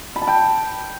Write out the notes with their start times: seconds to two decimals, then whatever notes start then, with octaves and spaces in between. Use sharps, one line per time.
0.16 B5
0.22 A5
0.27 G5